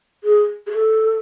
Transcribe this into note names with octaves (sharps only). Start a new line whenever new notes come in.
G#4
G#4
A4